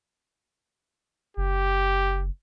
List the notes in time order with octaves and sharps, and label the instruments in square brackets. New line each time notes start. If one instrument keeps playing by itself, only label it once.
[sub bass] F#1 [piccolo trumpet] G4